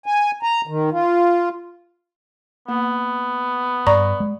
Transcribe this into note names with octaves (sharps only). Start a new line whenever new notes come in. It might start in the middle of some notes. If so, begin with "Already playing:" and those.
G#5
A#5
D#3
F4
A#3 B3
G2 D5 A#5 C#6
G#3